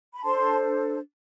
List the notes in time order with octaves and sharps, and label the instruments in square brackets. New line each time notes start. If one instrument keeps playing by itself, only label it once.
[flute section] B5
D4 A4 C5 A5 C6